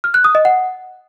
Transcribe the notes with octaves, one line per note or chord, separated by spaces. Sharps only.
F6
F#6
D#6
D#5
F#5